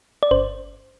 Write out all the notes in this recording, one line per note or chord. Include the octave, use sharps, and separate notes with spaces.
D5
G1 C5